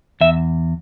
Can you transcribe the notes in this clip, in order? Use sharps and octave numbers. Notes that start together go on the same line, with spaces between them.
E2 E5